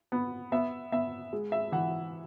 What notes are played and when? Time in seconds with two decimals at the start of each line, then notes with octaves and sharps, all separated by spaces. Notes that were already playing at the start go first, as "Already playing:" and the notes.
0.12 B3
0.52 B3 E5
0.92 B3 E5
1.33 G#3
1.52 E5
1.72 E3 F#5